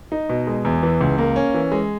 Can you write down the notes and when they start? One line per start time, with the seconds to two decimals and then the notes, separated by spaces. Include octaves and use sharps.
0.12 D#4
0.29 B2
0.47 G#3
0.65 E2
0.83 E3
1.01 C#2
1.18 A#3
1.36 C#4
1.54 E3
1.72 G#3